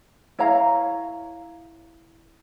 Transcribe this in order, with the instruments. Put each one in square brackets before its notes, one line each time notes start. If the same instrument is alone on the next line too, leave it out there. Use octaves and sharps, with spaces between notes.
[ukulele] E4 C#5 F5 A#5